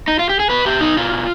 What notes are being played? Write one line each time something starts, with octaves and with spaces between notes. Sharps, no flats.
D#4
F4
G4
G#4
B2 B4
B2 G4
B2 D#4
B2 F4
B2